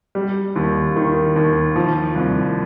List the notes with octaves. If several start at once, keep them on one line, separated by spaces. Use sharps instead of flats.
G3
D#2
D#3
D#2
F3
C2